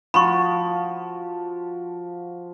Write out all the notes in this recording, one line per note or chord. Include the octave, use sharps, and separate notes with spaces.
F3 F#4 B5 C#6